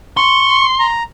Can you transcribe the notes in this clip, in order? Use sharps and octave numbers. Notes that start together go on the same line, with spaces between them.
C6 C#6
A#5